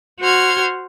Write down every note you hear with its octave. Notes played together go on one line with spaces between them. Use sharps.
F#4 C5 F6 G#6